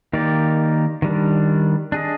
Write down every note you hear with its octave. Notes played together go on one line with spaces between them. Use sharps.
D#3 A#3 D#4 G4 D5
D#3 G3 D4
D4 G#4 D#5